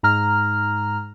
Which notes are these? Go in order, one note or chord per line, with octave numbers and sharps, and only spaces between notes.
G#2 A#5 F6